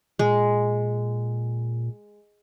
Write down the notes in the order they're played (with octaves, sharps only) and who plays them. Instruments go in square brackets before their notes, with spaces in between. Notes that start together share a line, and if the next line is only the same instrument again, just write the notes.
[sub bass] A#2 [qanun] G#3